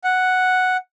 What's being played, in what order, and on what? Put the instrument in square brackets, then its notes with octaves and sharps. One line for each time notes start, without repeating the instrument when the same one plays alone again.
[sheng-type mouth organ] F#5